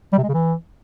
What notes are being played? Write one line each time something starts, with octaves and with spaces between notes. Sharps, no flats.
G3
C3
G#3
C#3
E3